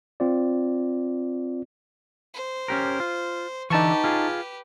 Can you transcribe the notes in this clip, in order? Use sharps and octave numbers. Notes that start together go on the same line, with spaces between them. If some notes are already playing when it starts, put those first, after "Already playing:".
C4 F4 D5
C5
C#4 G4 A#4
F4
D3 E3 D#4 G4 B4 A5 C#6
F4 G#4